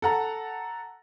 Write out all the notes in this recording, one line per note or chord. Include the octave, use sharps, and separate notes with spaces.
A4 F#5 A#5